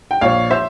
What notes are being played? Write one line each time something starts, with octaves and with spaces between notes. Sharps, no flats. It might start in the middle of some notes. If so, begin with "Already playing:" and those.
G5
A#1 C#5 F5
C5 E5